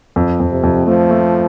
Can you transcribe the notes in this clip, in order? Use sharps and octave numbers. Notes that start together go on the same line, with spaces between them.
F2
F2
C3
F2
F3 A3
A3